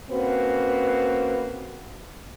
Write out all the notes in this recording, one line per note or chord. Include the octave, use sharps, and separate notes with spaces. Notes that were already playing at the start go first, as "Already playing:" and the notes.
A#3 C4 C#4 F#4 B4